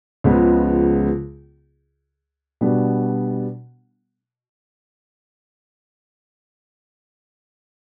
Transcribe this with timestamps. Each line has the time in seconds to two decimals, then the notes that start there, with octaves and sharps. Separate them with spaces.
0.24 C#2 C#3 F3 G#3 B3
2.61 B2 G3 B3 D4 F#4